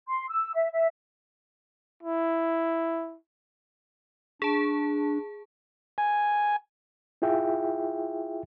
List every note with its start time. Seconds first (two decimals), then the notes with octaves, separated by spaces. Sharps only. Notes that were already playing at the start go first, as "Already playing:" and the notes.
0.07 C6
0.29 E6
0.53 E5
0.71 E5
2.03 E4
4.42 D4 G#4 A5
5.98 G#5
7.22 E4 F4 G#4 E5 G5